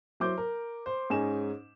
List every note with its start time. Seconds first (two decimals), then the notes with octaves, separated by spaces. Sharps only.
0.20 F#3 E4 C5 D6 G6
0.37 A#4
0.86 C5
1.10 G#2 C#4 D#4 G#5 E7